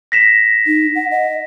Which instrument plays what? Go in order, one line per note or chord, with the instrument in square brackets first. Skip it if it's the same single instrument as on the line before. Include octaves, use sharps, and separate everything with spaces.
[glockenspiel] A#6 B6 E7
[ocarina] D#4
F#5
D#5